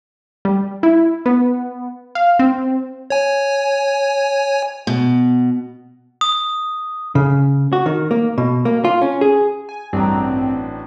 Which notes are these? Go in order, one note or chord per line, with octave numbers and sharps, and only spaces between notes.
G3
E4
B3
F5
C4
C#5 G#5
B2
D#6
C#3
F#4
D#3
A#3
B2
A#3
F4
C#4
G#4
G#5
A1 G2 C4 D4 F#4 G5 A#5